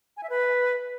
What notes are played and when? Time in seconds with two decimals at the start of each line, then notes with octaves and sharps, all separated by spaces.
0.17 G#5
0.23 E5
0.30 B4